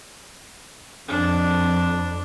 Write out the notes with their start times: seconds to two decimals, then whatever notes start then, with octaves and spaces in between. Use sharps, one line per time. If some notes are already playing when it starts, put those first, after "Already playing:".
1.08 F2 D4